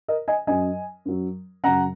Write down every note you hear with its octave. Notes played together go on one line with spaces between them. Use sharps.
A#4 D#5
D#5 G#5
F#2 F#3 D#5 G#5
F#2 F#3
F#2 C#3 F#3 F#5 A#5